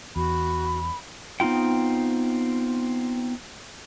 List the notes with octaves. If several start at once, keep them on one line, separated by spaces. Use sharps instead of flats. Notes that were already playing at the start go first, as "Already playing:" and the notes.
E2 F#4 B5
B3 C4 D#4 F4 G5